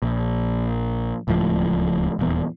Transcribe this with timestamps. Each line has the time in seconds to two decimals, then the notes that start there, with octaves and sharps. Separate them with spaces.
0.02 A#1
1.28 D1 C#2 A2 F3
2.19 D#1 E2